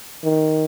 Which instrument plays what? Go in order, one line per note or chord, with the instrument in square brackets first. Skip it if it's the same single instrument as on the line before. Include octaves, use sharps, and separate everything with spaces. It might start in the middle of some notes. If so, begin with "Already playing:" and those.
[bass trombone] D#3